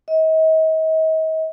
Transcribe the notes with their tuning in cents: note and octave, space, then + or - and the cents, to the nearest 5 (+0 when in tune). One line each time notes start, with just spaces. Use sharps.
D#5 +40